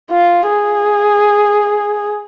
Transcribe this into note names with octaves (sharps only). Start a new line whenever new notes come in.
F4
G#4